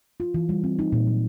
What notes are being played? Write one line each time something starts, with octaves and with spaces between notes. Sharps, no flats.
F4
E3
G3
C4
D#4
A#2
F#3